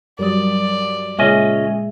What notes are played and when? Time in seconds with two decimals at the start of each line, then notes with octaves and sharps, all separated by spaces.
0.19 G2 F#3 G3 A#4 D5 D#6
1.19 C#2 A#2 G#3 C#4 D#5 E5